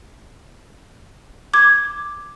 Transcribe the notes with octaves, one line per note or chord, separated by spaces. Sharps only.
D6 G#6